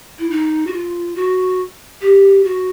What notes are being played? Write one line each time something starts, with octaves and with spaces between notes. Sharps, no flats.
E4
D#4
F#4
F4
F#4
G4
F#4